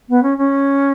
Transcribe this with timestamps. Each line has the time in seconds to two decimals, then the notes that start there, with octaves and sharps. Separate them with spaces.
0.09 B3
0.23 C#4
0.38 C#4